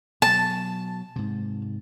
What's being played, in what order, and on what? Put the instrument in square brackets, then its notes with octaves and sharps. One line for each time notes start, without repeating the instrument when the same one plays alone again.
[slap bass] B2 F#3 [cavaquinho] A5
[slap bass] G#2 C3